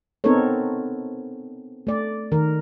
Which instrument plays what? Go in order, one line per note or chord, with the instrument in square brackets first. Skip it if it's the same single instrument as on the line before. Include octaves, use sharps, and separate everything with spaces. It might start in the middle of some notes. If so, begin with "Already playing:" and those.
[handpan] B3 C4 D#4 A4 A#4 C#5
A3 D5
D#3 A#4